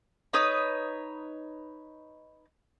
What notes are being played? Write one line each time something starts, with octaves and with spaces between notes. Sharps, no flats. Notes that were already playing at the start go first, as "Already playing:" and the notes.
D#4 B4 C#5 D#6